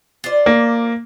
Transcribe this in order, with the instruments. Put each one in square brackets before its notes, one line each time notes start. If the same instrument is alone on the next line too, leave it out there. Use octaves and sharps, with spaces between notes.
[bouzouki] F4 C5 D5
[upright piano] A#3